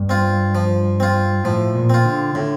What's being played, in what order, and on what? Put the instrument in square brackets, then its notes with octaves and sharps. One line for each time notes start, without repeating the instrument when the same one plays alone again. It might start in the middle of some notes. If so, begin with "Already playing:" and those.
Already playing: [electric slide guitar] G2
[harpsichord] C4 F4
F3
C4 F4
[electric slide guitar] A2 [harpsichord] F3
[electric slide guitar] A#2
[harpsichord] C4 F4
[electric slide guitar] D3
[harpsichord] A2 [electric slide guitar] D3